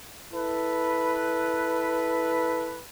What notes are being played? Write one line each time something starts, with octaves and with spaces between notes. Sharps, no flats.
E4 A4 B4